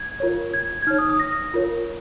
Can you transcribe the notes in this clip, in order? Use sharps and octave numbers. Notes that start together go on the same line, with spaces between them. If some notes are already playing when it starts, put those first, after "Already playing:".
Already playing: G#6
F4 A#4 C#5
G#6
G#6
D#4 C#5 F6
D#6
D#6
A#6
F4 A#4 C#5